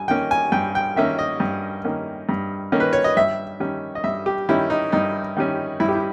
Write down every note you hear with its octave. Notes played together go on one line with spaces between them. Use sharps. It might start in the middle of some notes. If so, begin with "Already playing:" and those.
Already playing: G2 G#5
D#3 A#3 C#4 G5
G#5
G2 G5
G5
D#3 A#3 C#4 E5
D#5
G2
D#3 A#3 C#4
G2
D#3 A#3 C#4
B4
C#5
D#5
G2 E5
D#3 G3 C#4
D#5
G2 E5
G4
D#3 G3 C#4 E4
D#4
G2 D#4
D#3 G3 C#4
G2 E4
G4
E4